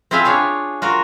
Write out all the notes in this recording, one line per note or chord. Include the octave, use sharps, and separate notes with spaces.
C4 E4 F4 G#4 E5 F5
D4 G#4 C#5 F5
F4 F#4 A#4